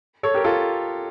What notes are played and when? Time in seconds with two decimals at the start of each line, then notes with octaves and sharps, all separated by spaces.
0.23 A4 C#5
0.34 G4 A#4
0.44 F4 A4